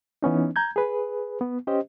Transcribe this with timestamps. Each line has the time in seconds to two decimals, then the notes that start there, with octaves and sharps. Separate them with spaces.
0.23 E3 B3 C#4 D#4
0.56 A#5 G6 G#6
0.76 G#4 B4
1.41 B3
1.67 C#4 G4 C5 D#5